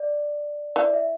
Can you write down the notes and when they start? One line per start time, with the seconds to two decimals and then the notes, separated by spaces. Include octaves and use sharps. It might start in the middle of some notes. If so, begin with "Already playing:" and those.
Already playing: D5
0.76 E3 D5
0.93 E5